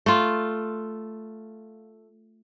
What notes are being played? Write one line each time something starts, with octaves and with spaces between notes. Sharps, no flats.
A3 F4